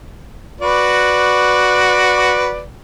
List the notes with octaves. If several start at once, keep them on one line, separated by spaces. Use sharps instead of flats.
F#4 B4 D5